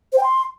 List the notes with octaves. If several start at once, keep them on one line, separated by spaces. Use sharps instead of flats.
C5
G5
C6